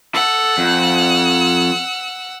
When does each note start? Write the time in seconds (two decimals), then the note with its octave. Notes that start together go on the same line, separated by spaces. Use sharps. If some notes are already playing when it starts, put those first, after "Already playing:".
0.15 A4 F#5 E6
0.58 F2